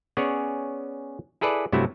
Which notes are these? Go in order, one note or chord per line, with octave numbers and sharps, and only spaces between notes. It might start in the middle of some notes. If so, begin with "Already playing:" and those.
B3 C#4 G#4 C#5 D5
E4 G#4 A4 B4 D5
G2 C3 F#3 A3 E4 F#4